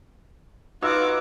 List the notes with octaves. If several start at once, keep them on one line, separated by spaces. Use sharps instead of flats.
D#4 F4 F#4 B4 D#5 D6 E6